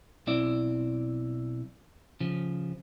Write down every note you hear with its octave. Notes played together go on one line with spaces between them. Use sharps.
B1 C4 E4 D5
C#3 F3